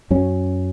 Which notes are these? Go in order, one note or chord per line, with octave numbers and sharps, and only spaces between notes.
F#2 F#3 C#4